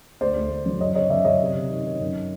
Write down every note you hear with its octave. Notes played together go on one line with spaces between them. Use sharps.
D2 C5 D5
D2
D2
F#3
F#2 C#5 D#5
C#3 C#5 D#5
F#2 D5 E5
F#2 C#5 D#5
C3
C3
D#3
D#3
F#2